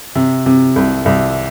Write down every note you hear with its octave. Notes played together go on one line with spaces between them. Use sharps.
C3
C3
C2
C2